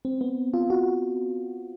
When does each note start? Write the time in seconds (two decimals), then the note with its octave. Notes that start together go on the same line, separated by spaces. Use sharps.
0.05 C4
0.21 B3
0.54 F4
0.70 F#4